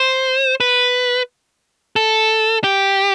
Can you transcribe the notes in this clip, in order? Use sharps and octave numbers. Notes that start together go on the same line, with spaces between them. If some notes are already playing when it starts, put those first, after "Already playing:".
Already playing: C5
B4
A4
G4